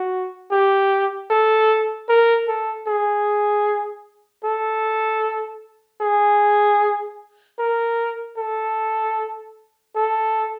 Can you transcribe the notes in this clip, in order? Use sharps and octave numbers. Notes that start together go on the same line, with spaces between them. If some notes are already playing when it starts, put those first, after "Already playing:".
Already playing: F#4
G4
A4
A#4
A4
G#4
A4
G#4
A#4
A4
A4